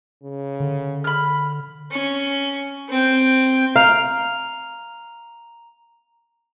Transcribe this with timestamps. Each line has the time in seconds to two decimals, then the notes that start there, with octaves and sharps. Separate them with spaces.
0.23 C#3
0.60 D3
1.04 B5 F6
1.91 C#4
2.89 C4 G5
3.76 F5 A#5 F7